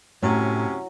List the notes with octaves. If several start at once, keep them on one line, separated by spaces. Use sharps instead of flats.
A2 C3 F#3 C#4